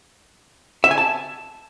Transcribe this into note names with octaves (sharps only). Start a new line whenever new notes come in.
E5
G#5
A5